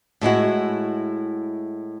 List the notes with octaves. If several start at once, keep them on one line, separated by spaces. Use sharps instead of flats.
A2 G#3 E4 F#4